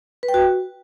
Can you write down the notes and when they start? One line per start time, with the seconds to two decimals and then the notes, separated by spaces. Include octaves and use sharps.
0.23 B4
0.28 G5
0.34 F#4